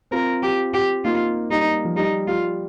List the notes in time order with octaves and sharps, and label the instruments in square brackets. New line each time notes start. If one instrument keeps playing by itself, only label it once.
[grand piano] C4 F4 [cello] A#4
[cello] G4
G4
[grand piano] A#3 D#4 [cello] F4
[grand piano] G3 [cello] D#4
[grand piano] F3
[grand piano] G3 [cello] D#4
[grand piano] G3 [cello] F4